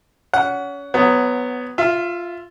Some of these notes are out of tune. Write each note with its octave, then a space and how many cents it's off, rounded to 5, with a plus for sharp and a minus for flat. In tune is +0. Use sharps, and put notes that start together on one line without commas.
C#4 +30 F#5 +0
F#3 +0 B3 +10
F4 +0 E5 +25